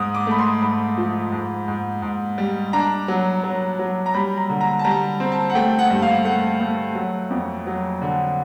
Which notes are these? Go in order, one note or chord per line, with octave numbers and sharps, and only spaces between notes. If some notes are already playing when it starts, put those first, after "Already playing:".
Already playing: G#2 D#6
D6
A3 B5
C6
G#2 B5
F3
G#2
G#2
G#2
G3
D4 A#5
F#3
F#3
F#3
A#5
G3 B5
A#5
D3
A#5
A5
G3 A#5
C4
A5
F#5
A3 G5
F#5
G2
F5
A3 F#5
A3
F#3
F2
F#3
D3